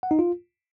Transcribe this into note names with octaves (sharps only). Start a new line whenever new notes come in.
F#5
D#4
F4